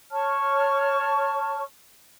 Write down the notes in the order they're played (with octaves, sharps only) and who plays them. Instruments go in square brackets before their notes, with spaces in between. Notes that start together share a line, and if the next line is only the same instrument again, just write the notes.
[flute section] C#5 A5 C#6 F6